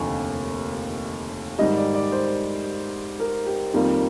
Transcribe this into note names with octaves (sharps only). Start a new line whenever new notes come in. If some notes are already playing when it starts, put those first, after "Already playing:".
Already playing: F1 D#2 D3 F3 G#5
G#2 D#3 G3 D#5
D5
D5
C5
A#4
G4
F2 D#3 G3 A#3 F4